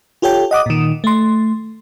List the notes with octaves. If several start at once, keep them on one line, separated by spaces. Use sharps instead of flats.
F4 G4 A4 C#5 G5
D#5 F#5 D6 D#6
A#2 D#3
A3 C6